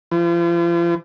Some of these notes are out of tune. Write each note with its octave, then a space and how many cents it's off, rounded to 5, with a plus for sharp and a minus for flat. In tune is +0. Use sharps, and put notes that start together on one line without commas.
F3 -40